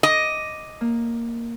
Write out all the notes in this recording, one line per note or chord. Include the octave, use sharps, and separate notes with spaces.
D#5 D6
A#3